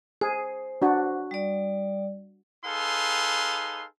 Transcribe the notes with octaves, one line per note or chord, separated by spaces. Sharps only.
G#4 C5
D4 F#4
G3 D5
D#4 G#4 A4 B4 F5 C6